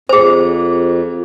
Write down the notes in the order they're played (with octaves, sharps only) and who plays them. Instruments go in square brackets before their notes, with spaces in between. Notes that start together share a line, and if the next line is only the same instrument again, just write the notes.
[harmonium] F2 [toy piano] G#4 C5